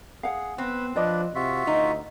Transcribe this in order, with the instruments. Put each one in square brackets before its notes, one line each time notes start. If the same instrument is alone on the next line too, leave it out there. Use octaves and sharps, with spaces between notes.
[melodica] G#4 [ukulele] F5 F#5
[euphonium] B3 [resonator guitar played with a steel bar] C4 [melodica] B4
[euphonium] F3 [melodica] D4 B4 [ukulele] D5 D#5
[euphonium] C3 [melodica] F4 F#4 E5
[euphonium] D2 [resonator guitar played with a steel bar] D#4